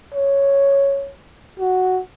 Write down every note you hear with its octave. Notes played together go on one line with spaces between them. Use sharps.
C#5
F#4